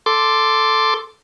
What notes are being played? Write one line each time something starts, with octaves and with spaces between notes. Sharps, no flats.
A4 C6 D6